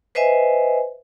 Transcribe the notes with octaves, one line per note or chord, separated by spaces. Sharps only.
B4 C5 D#5 E5 G#5